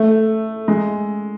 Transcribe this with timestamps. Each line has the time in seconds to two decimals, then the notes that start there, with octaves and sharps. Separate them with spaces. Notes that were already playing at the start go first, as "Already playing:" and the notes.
Already playing: A3
0.68 G#3